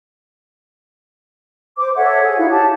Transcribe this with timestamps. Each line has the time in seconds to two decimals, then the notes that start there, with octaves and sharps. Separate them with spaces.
1.77 C5 D6
1.95 A4 C#5 E5 F#5
2.24 G#4
2.37 D#4 E4 F#4 F5
2.50 G4 F#5 A5